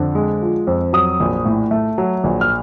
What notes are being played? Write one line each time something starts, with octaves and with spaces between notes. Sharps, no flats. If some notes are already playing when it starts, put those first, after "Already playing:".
Already playing: F2 D3
G#3
F3
F2
F#3 D#6
A#1
A2
A3
F#3
A#1
F6